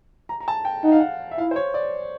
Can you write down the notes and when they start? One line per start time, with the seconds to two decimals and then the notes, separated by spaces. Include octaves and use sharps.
0.29 A#5
0.40 A#5
0.48 A5
0.65 G5
0.84 D#4 F#5
0.92 F5
1.00 F#5
1.31 E5
1.38 E4 F5
1.51 C5
1.56 C#5
1.74 D5